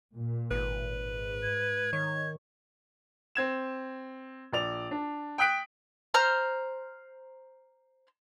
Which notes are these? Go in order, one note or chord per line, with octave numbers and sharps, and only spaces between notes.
A#2
G#1 B4
G#2
G#6
D#3 C#5
C4 G#6 E7
A#1 D5 F7
D4
G5 D#6 F#6 B6 D7
C5 A#5 F6